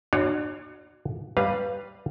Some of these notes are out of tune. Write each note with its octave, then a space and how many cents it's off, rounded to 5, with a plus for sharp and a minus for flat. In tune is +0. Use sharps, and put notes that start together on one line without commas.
D4 +35 F#4 +0 C#5 +0
G3 +0 B4 +0 F5 +0